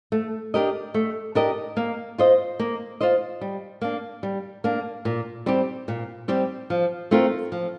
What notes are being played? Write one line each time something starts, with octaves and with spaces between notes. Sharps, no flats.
A3
D4 G4 A#4 D#5
A3
D4 G4 A#4 D#5
A#3
F4 C5 D#5
A#3
F4 C5 D#5
G3
A#3 D4
G3
A#3 D4
A#2
G3 C4 G4
A#2
G3 C4 G4
F3
A3 C4 F4 A#4
F3